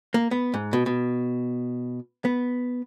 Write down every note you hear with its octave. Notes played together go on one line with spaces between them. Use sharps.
A#3
B3
G#2
B2
B2
B3